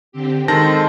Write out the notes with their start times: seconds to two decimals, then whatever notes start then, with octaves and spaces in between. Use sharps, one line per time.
0.12 D3 C4 G4
0.48 D#3 G#3 C4 A4 C5 A5 A#6